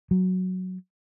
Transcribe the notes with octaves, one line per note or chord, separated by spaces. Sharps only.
F#3